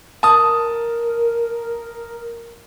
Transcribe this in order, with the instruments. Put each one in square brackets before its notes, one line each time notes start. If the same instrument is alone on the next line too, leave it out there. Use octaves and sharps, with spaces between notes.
[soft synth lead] A#4 [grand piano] A5 D#6